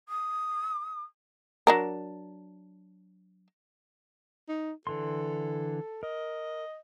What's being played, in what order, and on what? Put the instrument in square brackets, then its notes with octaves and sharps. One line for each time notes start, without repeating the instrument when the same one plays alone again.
[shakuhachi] D#6
[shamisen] F#3 D4 A#4
[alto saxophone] D#4
[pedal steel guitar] D3 E3 C6 [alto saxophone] A4
[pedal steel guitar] A#4 [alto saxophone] D#5